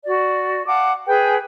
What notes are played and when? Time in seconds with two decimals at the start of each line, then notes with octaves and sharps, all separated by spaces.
0.05 F#4 D5
0.67 F5 F#5 A5 D6
1.06 G#4 B4 G5 G#5